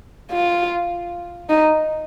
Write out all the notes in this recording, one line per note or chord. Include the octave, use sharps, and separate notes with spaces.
F4
D#4